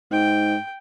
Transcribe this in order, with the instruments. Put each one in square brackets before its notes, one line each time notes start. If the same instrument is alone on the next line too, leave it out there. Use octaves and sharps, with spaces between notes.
[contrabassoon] G#2 [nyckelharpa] G5